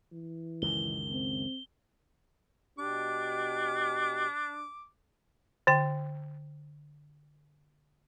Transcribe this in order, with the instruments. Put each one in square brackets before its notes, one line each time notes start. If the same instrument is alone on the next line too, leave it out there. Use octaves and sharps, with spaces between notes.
[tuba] E3
[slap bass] C#2 F#2 D#3 [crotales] G7
[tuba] C4
[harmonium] B2 G4 [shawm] D4 [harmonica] D6
[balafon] D3 G5